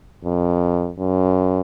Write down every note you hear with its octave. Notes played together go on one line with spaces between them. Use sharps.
F2
F#2